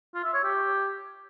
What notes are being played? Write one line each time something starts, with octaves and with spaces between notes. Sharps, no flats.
F4
E5
C#5
G4